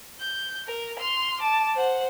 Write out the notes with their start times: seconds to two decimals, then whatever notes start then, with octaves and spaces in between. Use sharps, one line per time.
0.20 G6
0.67 A#4
0.99 C6 F6
1.41 A5 D6
1.75 C5 F#5